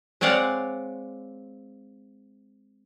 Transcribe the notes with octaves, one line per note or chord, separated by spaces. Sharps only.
G#3 C4 C#5 D5 F5 F#5